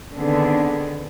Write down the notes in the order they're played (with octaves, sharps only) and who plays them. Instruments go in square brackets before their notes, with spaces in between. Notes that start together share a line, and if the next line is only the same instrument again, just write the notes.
[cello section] D3 D#3 B3 C4 D4 G#4